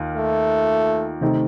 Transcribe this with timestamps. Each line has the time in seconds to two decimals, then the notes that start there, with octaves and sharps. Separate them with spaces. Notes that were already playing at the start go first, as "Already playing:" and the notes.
Already playing: D#2 F4
0.17 A3
1.21 C3 D#3 A3 C4 D#4